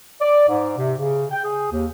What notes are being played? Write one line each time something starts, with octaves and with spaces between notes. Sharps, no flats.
D5
G#2
C3
C#3
G5
G#4
D#2